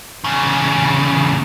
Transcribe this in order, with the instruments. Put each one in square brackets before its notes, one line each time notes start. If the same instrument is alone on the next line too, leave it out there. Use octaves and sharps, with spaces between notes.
[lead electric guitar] E2 C#3